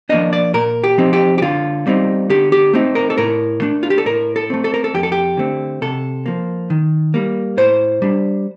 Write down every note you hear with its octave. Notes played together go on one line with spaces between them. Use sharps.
F3 A#3 D4 D#5
D5
A#2 A#4
G4
F3 C4 D#4
G4
G4
D3 F4
G3 C4 D#4
D3 G4
G4
A3 C4 D#4
A#4
A4
A2 A#4
A3 D4
F4
G4
A4
A2 A#4
A4
A3 C4
A4
A#4
A4
F2 G4
A4
G4
D3 A3 C4
C3 A4
F3 A#3
D#3
G3 A#3
A2 C5
G3 D4